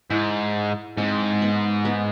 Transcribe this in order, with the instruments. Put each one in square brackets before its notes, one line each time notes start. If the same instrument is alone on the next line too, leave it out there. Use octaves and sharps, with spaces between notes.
[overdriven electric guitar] G#2 [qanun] E4
[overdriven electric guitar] G#2 [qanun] C4
[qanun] B3
B3